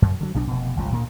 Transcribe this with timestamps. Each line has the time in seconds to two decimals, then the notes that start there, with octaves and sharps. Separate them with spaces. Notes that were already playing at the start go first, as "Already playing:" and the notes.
0.02 F#2
0.21 D3 F#3
0.34 B1 B2 C4 D4
0.47 F1 B2
0.76 G1 C#2 F3
0.92 D2 A#2 A#3